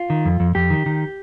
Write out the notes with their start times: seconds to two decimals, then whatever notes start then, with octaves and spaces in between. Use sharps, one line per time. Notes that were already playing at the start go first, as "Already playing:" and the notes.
Already playing: F4
0.10 D#3
0.25 F2
0.40 F2
0.55 F2 G4
0.70 D#3
0.86 D#3